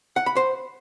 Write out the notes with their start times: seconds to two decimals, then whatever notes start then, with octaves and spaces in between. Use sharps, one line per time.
0.16 F#5
0.26 B5
0.37 C5